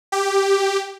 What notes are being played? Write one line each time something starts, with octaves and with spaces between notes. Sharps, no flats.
G4